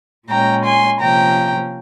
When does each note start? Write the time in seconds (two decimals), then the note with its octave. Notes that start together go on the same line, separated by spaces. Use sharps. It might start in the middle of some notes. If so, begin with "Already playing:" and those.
0.28 A#2 G#3 C#4 G5 A#5
0.64 G#5 C6
1.00 C3 F3 A#3 C#4 G5 A#5